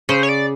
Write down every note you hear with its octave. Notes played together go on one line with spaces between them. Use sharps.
C#3 C5
C#5
D5